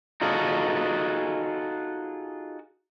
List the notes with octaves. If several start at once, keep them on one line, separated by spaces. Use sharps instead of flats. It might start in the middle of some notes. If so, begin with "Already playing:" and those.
D#4 F4 F#4 G#4 A4